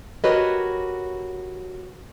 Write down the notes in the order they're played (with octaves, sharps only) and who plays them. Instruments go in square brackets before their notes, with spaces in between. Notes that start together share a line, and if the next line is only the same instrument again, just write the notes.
[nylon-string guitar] F#4 G4 A#4 B4 C#5 D#5